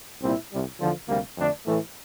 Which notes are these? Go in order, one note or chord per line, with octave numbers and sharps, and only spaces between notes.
C2 A#2 G3 C4 E4
C2 C3 G3
E2 D3 F3
D2 C3 G3 A#3
F2 D3 A3 D4
A2 E3 A3